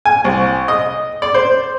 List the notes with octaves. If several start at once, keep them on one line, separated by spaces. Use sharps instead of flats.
G#5
C2
D#5
D5
C5